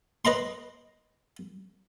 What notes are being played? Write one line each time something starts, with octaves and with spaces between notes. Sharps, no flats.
B4 D#5 A#5 C6